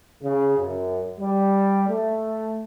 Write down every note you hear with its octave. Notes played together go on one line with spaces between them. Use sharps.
C#3
F#2
G3
A3